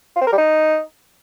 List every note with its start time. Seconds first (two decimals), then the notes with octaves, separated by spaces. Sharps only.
0.16 F4
0.22 C4
0.27 A#4
0.33 G3
0.38 D#4